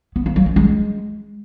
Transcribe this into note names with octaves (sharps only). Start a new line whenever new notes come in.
B3
A#3
F#3
C#4
G#3